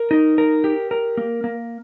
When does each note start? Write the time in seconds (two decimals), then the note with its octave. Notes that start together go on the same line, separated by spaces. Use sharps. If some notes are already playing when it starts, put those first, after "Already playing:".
Already playing: A#4
0.11 D#4
0.38 A#4
0.64 G4
0.91 A#4
1.17 A#3
1.44 A#3